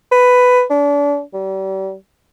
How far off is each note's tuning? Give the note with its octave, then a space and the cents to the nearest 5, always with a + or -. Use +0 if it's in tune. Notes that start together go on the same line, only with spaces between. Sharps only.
B4 +10
D4 -35
G3 -35